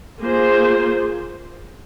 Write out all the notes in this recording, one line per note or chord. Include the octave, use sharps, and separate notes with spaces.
A#3 F4 G#4 C5